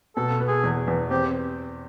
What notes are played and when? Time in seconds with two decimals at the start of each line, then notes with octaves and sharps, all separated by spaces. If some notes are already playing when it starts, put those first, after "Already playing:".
0.16 B2 A4
0.40 B3
0.48 G#4
0.64 E2
0.88 E2
1.10 C4 G4